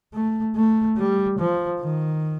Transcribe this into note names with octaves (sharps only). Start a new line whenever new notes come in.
A3
A3
G3
F3
D#3